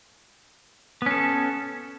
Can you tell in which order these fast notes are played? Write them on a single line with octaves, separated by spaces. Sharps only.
B3 C#4 A4